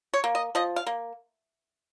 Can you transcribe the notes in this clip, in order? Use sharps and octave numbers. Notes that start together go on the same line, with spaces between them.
C#5
A#3
D#5
F3 D#5
F5
A#3